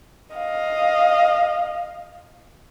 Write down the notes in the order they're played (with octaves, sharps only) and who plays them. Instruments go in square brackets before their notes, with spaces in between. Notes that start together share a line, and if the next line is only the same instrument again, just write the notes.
[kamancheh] D#5 F5